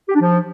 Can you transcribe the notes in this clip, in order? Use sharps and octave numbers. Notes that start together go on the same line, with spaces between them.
G4
D4
F3